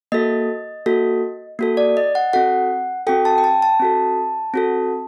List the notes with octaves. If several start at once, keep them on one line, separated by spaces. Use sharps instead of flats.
A#3 F#4 A4 D#5
A#3 F#4 A4
A#3 F#4 A4
D5
D#5
F#5
C4 F#4 A4 F#5
C4 F#4 A4 G5
A5
G5
A5
A5
C4 F#4 A4
C4 F#4 A4